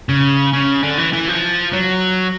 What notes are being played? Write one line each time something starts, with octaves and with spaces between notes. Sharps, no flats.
C#3
C#3
D3
E3
E3
F3
F#3